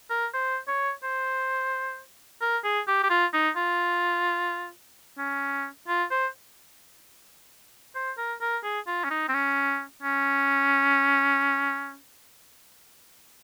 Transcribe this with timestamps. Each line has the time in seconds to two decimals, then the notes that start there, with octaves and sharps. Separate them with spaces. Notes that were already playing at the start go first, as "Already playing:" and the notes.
0.10 A#4
0.34 C5
0.68 C#5
1.03 C5
2.41 A#4
2.64 G#4
2.88 G4
3.04 G4
3.10 F4
3.33 D#4
3.56 F4
5.18 C#4
5.88 F4
6.11 C5
7.95 C5
8.18 A#4
8.41 A#4
8.64 G#4
8.87 F4
9.04 C#4
9.11 D#4
9.28 C4
9.34 C#4
10.03 C#4